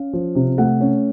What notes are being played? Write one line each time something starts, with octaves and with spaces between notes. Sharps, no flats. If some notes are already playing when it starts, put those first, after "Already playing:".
Already playing: C#4 F5
F3
C3
A3 F#5
C#4